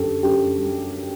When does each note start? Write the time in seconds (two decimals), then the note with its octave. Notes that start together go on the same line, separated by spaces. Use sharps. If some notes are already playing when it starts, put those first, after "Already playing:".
Already playing: F#2 D3 G4 A4
0.23 F#2 G4
0.58 G3